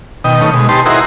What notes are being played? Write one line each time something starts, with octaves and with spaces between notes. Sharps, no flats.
B2 D#3 D#5 G5
D#3 A3 B3 C#4 D#4
B2 G#3
D#4 G4 B4 C5 A5 C6
D#4 E4 F#4 G#4 A#4 C5